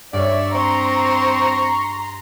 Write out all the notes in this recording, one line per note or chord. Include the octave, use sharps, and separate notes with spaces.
G2 C#5 D5 E5
C4 A#5 C6 C#6